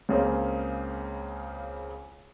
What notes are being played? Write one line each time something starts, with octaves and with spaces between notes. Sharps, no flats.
C#2 C#3 A#3 C4